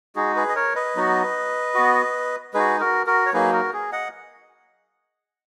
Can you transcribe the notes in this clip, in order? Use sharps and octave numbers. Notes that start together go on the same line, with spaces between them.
G#3 D#4 F#4 G#4
G#4 B4
D#5
A#4 C#5
B4 D#5
F#3 B3 D#4 F#4
B3 F#4
G#3 D#4 F#4 G#4 B4
F#4 A#4
F#4 A#4
C#5
F#3 A#3 D#4 G#4 B4
F#4 A#4
G#4
D#5 F#5